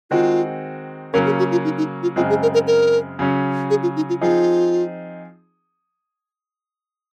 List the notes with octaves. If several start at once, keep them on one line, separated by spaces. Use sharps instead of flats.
D#3 G#3 C4 F4 F#4
C#3 F#3 A#3 C#4 A#4
G#4
F#4
F4
D#4
D#4
F4
F#2 C#3 G#3 C4 F4
G#4
A#4
A#4
A#4
C#3 F#3 C#4
G#4
F4
D#4
F4
F3 C4 D#4 F4 G#4